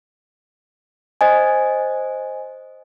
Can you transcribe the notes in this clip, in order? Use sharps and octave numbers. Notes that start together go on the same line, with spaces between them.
C5 D#5 G#5